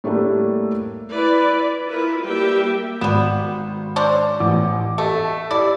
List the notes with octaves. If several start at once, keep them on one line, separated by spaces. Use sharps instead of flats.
A2 G3 A3 A#3 D4 A4
E4 B4 D5
E4 F4 A#4 B4
G3 A#3 G4 E5 G5
G#1 G3 B3 E7
C#4 D4 C5
A1 D6
A3 A4 D#5 E5
E4 G4 D5